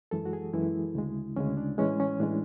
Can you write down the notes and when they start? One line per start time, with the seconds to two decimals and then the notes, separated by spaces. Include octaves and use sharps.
0.11 F#2 E3 G#3 A4
0.26 F#4
0.33 G#4
0.53 F#2 E3 G#3 E4
0.95 D2 C#3 G#3
1.36 D2 C#3 G#3 C#4
1.57 D4
1.78 A2 E3 G#3 C#4
2.00 C#4
2.20 A2 E3 G#3 D4